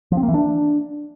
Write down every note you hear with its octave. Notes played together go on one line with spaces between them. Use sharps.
F3
C4
A#3
E3
D4